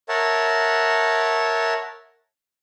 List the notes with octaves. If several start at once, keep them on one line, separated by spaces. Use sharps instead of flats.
A#4 C#5 E5 F#5 A5